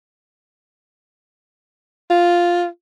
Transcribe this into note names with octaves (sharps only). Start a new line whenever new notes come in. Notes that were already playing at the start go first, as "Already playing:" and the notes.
F4